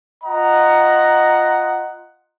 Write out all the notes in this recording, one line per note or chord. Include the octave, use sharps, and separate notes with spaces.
F4 D#5 F#5 A#5